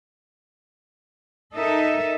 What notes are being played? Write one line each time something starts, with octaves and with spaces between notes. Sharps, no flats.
D#4 A4 A#4 D#5 E5